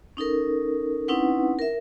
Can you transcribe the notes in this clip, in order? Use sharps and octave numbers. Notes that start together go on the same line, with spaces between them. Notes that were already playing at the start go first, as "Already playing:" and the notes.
C#4 D#4 A4 A#4
C4 C#4 D#4 E4 B4 F#5
A#4 E5